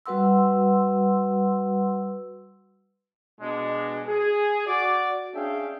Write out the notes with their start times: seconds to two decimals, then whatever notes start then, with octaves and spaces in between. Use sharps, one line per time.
0.06 G3 F#4 B4 F#5 C6 E6
3.41 B2 G#3 D4
4.08 G#4
4.67 F#4 D5
5.35 C#4 D4 G#4 E5 F5 G5